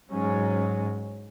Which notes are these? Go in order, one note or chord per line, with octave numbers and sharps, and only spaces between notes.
G#2 F#3 C#4